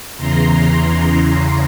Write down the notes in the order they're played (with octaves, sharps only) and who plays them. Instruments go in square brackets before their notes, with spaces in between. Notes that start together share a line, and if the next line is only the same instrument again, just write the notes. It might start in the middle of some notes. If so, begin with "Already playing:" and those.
[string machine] E2 C#3 E3 A#5 C6